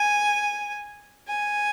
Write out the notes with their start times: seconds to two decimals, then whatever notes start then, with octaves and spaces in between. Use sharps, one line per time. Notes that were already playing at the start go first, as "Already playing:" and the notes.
Already playing: G#5
1.27 G#5